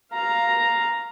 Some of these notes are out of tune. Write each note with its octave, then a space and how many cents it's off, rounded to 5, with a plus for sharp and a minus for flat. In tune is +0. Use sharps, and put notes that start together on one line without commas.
F5 +0 A#5 +0